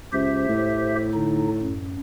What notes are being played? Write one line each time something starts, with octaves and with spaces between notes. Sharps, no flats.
C#2 G4 C5 E5
A2
D3 D#4
F#2